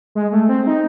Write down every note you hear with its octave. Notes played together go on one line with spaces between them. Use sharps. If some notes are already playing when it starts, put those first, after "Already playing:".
G#3
A3
C4
D#4